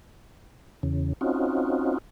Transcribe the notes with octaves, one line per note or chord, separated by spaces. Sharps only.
E2 C#3
C4 C#4 D#4 F4 F#4